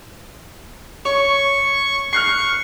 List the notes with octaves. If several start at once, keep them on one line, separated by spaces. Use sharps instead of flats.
C#5 C#6
C#6 F6 F#6 C7